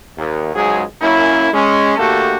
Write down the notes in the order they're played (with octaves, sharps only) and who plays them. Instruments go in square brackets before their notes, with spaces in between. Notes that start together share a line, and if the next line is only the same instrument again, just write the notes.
[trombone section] D#2
C#2 G#2 F#3 G#3 G#4
F#2 A#3 C#4 E4
G#3 C#4
D3 A3 A#3 F#4 G4 A4